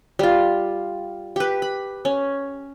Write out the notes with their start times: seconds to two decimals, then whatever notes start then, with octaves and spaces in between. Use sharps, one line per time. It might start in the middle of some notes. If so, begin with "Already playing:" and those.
0.19 G3 F4
1.36 G4 B4
1.62 B5
2.05 C#4